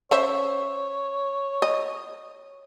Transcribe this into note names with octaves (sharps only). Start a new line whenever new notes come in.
C#4 C5 C#5 E5
D#5